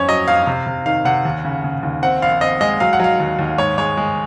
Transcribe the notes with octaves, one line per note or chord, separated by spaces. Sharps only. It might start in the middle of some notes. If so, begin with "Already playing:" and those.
Already playing: F2 C#4 C#5
F#3 D#5
F2 F5
C3
C3
D#3 F5
C3 F#5
D#2
C#3
C#3
D#2
C4 F#5
A#1 F5
C4 D#5
G#3 D#5
F#3 F5
F#5
F#3 F5
D#2
D#2
G#2 C#5
G#3 C#5
G#3